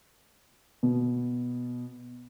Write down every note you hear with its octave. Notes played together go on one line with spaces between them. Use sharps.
B2